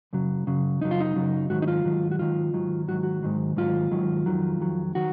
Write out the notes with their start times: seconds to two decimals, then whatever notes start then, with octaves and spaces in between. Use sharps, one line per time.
0.13 F#2 C#3 F#3
0.47 F#2 C#3 F#3
0.81 F#2 C#3 F#3 D#4
0.91 F4
1.00 D#4
1.16 F#2 C#3 F#3
1.50 G#2 D#3 F#3 F#4
1.62 D#4
1.68 F4
1.85 G#2 D#3 F#3
2.11 F#4
2.19 G#2 D#3 F#3 F4
2.53 G#2 D#3 F#3
2.88 G#2 D#3 F#3 F#4
3.03 F#4
3.23 G#2 D#3 F#3
3.57 G#2 D#3 F#3 F4
3.91 G#2 D#3 F#3
4.26 F2 D#3 F#3
4.60 F2 D#3 F#3
4.95 D#3 F#3 F#4